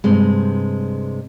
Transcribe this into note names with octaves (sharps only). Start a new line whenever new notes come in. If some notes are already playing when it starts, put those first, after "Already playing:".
G2 C3 G#3